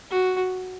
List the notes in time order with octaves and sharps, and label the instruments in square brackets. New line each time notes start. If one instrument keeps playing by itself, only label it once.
[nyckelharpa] F#4